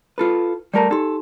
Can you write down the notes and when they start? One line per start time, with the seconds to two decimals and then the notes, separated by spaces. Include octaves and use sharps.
0.18 F4 A4 B4
0.74 G3 A3 A#4 D5 A5 A#5
0.91 D#4 G4 A4 C6